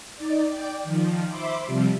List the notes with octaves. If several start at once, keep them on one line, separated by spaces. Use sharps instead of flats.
D#4 D5
D5 G5
D#3 F3
C5 E5 B5 C6 D6
C3 F3 G3